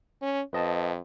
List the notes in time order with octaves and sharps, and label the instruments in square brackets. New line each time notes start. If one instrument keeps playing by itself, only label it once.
[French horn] C#4
[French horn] F2 [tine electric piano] B4 D#5 A5